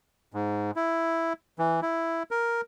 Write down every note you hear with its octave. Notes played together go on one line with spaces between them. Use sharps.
G#2
E4
E3
E4
A#4